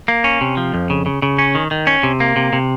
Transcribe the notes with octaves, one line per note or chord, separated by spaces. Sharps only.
A#3
C#4
C3
F3
F2
C#3
C#3
C#3
C#4
D#3
D#3
C#4
C3
A#3
C3
C3